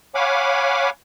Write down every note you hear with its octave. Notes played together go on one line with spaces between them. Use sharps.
C#5 F5 F#5 G#5 B5 D6